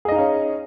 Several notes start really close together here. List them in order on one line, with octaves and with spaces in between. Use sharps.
G#4 D#5 D#4 F5 C#4